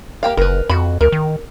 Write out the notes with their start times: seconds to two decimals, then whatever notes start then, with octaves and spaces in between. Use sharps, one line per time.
0.23 A#3 G4 F5
0.37 F#1 A#4 B4
0.69 F2 F#4 B5
1.01 D2 A#4
1.12 D#3